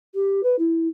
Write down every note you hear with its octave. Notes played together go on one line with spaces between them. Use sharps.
G4
B4
E4